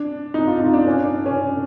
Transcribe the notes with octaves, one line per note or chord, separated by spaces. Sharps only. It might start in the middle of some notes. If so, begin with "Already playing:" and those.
Already playing: D4
D#4
F4
D#4
D4
C#4
D4
C#4